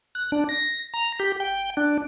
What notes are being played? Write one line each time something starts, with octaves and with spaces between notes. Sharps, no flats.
F#6
D4
A#6
A#5
G4
G5
D4